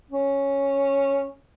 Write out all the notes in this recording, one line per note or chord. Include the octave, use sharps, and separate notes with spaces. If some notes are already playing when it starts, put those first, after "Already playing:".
C#4